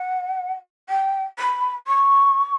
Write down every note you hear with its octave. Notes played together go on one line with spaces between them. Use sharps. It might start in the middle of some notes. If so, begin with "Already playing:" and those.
Already playing: F#5
G5
B5
C#6